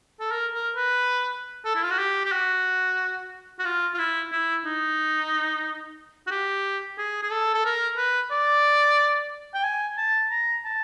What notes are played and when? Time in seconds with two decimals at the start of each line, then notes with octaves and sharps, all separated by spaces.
0.20 A4
0.31 A#4
0.54 A#4
0.76 B4
1.65 A4
1.75 E4
1.83 F4
1.91 F#4
1.99 G4
2.25 G4
2.32 F#4
3.59 F#4
3.65 F4
3.94 F4
3.99 E4
4.32 E4
4.65 D#4
6.27 F#4
6.31 G4
6.98 G#4
7.23 G#4
7.31 A4
7.54 A4
7.65 A#4
7.97 B4
8.31 D5
9.54 G5
9.64 G#5
9.98 A5
10.30 A#5
10.65 A5